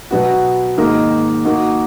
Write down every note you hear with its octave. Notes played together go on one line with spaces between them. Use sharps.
B2 F#3 B3 F#4
G#2 D#3 A#3 D#4 A#4
A#3 D#4 F#4